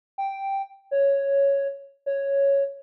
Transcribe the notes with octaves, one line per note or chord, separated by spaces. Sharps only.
G5
C#5
C#5